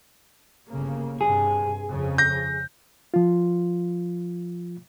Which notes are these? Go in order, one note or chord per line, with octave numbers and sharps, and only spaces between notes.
G1 C#3 A#3
G2 C3 G#4
F2 C#3
G6 A#6
F3 F4